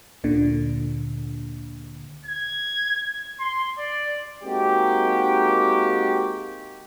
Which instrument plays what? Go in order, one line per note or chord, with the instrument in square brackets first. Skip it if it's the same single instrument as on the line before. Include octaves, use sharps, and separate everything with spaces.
[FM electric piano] D2 A#2 D3
[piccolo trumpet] G#6
C6
D5
[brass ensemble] G#3 A#3 C4 D#4 F#4 G4